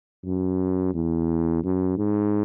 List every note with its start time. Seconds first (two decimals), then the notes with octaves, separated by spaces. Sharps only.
0.25 F#2
0.95 E2
1.64 F#2
1.98 G#2